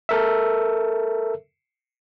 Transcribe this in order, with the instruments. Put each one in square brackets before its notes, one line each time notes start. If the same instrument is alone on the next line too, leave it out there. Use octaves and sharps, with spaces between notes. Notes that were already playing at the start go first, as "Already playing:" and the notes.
[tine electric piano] A4 A#4 E5